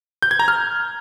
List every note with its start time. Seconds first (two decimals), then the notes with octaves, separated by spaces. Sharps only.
0.22 G6
0.31 G#6
0.39 A#5
0.48 F6